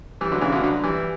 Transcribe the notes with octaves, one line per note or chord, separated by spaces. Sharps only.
E3 G3
D3 F#3
C#3 E3
B2 D3
D3 F#3
E3 G3